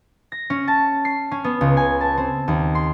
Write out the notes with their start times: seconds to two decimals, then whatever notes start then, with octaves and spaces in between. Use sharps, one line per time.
0.32 A#6
0.50 C#4
0.68 A5
1.05 C7
1.31 C#4
1.44 B3
1.61 C#2
1.77 G#5
2.01 A5
2.17 C4
2.48 D#2
2.75 C6